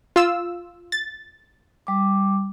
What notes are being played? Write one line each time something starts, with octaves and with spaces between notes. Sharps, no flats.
F4 E6
A6
G3 D6